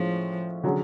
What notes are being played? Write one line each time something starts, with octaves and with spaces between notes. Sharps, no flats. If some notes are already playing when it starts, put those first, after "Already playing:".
Already playing: A2 F3 G#3 C#4 F4
D3 F#3 C#4 G#4